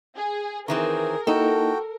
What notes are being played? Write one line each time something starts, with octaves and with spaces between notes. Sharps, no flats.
G#4
D#3 E3 C4 G#4 A#4
A#3 D#4 E4 F#4 A4 G5